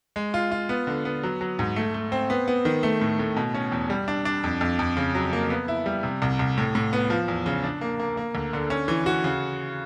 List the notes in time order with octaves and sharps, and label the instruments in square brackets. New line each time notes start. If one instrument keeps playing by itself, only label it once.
[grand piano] G#3
F4
F4
B3
D3
B3
F#3
F#3
G#2
A3
A3
C4
B3
B3
D#3
A3
A2
A2
B2
C#4
E2
G3
D4
D4
F2
F2
F2
C#3
F#3
A#3
B3
E4
G3
C3
C2
C2
A2
A2
B3
F3
E2
C#3
D4
A#3
A#3
A#3
D2
D3
C#4
E3
F#4
C#3